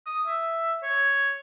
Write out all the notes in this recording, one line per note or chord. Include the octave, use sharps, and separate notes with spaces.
D#6
E5
C#5